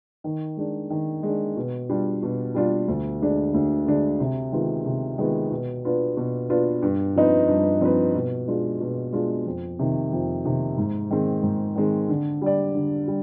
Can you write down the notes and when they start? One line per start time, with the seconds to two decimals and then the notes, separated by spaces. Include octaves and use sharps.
0.24 D#3
0.57 G#3 D4
0.90 D#3
1.23 G#3 D4
1.57 B2
1.89 G3 D4 F4
2.23 B2
2.54 G3 D4 F4
2.88 D2
3.21 D3 G#3 D4
3.54 D2
3.86 D3 G#3 D4
4.20 C3
4.52 D#3 G#3 B3 F4
4.86 C3
5.18 D#3 G#3 B3 F4
5.51 B2
5.84 B3 D4 F4 B4
6.17 B2
6.49 B3 D4 F4 B4
6.82 G2
7.15 F3 C4 D#4 B4
7.48 G2
7.81 F3 C4 D#4 B4
8.15 B2
8.48 G#3 D4 F4
8.81 B2
9.13 G#3 D4 F4
9.46 F2
9.79 C3 D#3
10.12 F2
10.45 C3 D#3
10.78 G#2
11.11 D#3 G#3 C4
11.43 G#2
11.76 D#3 G#3 C4
12.09 D3
12.42 G3 D4 G4 D5
12.75 D3
13.08 G3